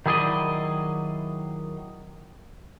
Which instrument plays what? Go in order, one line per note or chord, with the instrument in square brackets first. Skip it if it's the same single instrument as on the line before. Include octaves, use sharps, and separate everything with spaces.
[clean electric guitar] D#3 F#3 E4 G#4 D5 D#5